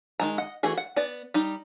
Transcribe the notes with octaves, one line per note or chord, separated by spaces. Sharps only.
D#3 G#3 A#5
D#5 F#5
E3 A3 F#4 G#4
F#5
B3 D5
G3 D#4